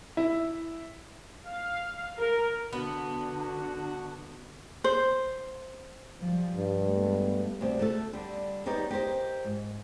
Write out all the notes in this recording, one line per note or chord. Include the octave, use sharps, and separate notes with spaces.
E4
F5
A#4
D3 B3 D4 F#4
C5
F3 G3
G2
G#3 A3 B3
D2 C3
A3 F#4 A4
D3 G3
B3 D#4 G4 C#5 D5
G4 A#4 C5 D#5
G#2